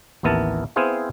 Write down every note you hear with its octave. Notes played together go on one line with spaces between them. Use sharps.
A1 D#2 B3 E4 A#4 A5
B3 C4 E4 G#4 C5 F5